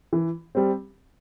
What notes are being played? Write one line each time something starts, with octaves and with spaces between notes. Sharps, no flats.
E3
G3 C4